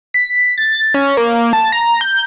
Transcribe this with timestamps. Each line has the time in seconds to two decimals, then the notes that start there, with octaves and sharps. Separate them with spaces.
0.14 B6
0.58 A6
0.94 C#4
1.17 A#3
1.53 A5
1.72 A#5
2.01 G6